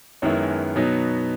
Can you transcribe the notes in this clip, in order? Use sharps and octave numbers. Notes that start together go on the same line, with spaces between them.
F#2 D#3 G#3 B3 E4 C#5
B2 F#3 B3 D#4